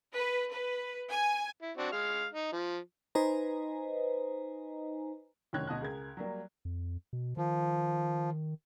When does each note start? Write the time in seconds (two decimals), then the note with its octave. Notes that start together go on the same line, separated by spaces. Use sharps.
0.14 B4
0.52 B4
1.11 G#5
1.62 E4
1.77 C4 D4 F#4
1.92 G#3 F5 F6
2.33 D#4
2.53 F3
3.15 D#4 B4 C5 D#5 G#5 A#5
5.53 F1 F#2 D#3 C#5 F#6 G#6
5.67 D2 B2 D#5 A5 F#6
5.81 C#2 G#4 A#4 G#6
6.17 F#3 G3 A#3
6.65 F2
7.13 B2
7.37 D#3 F3